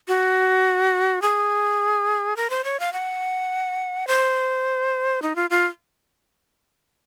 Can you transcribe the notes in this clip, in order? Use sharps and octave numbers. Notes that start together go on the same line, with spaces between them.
F#4
G#4
A#4
C5
C#5
F5
F#5
C5
D#4
F4
F4